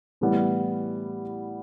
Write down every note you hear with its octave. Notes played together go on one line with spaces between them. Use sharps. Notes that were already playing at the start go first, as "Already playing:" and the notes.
A2 E3 G3 B3